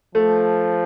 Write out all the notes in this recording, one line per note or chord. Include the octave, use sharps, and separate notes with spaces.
F3 A3